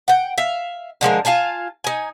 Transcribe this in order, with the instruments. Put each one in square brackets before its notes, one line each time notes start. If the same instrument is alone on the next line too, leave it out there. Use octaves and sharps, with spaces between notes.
[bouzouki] F#5 G5
E5 F5
D3 F3 G#3 A#4
F4 F5 G#5 A5
D#4 G#5